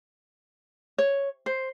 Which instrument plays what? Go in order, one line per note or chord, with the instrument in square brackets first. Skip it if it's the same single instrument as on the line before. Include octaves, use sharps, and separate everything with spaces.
[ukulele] C#5
C5